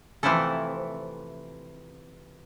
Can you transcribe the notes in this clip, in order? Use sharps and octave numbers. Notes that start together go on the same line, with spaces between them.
C3 E3 F3 A3 E4 A4